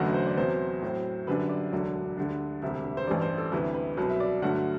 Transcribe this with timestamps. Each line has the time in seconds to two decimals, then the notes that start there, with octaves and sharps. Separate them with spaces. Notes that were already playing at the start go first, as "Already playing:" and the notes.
Already playing: F#1 E2 D3 F#3 A3 F#5
0.14 C5
0.26 D5
0.37 E2 C3 F#3 B3 C5
0.82 A2 F#3 C4
1.27 F#2 D3 G3 D4 B4
1.49 D5
1.72 E1 D2 D3 F#3
2.17 D2 D3 G3 D4
2.62 E1 D2 C3 G3 E5
2.84 E5
2.97 C5
3.07 A1 G2 E3 G3 D5
3.22 C5
3.38 A4
3.52 D2 C3 E3 G3 B4
3.74 B4
3.97 C2 B2 F#3 B4
4.09 E5
4.20 D5
4.42 G2 D3 F#3 A3 F#5